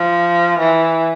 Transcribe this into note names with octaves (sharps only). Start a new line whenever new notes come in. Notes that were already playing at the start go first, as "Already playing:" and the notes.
Already playing: F3
E3